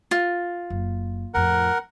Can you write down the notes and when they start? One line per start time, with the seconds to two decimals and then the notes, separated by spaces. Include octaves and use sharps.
0.11 F4
0.70 F#1
1.34 F2 A2 A#4 F#5